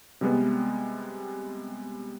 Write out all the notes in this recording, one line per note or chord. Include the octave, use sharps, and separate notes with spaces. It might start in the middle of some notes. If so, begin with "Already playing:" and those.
C3 G3 G#3 B3